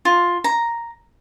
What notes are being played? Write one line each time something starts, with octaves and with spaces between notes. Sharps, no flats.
F4
A#5